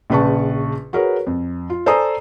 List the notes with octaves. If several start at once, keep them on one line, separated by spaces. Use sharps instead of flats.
A#1 C#3 B4 A5 C#6
F#4 G#4 A#4 B4 C#5
F2
F4
A4 C5 D5 G#5 A#5 D#6